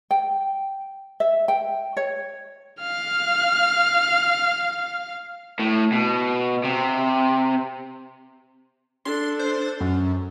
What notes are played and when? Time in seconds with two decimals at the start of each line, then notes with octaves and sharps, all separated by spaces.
0.11 G5
1.20 E5
1.48 G5
1.97 C#5
2.81 F5 F6
5.60 A2
5.92 B2
6.64 C3
9.05 D4 A4 C6
9.39 C5
9.80 F#2